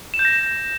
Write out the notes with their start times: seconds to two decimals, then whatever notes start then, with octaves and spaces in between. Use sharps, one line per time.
0.14 E7
0.19 G6
0.25 A#6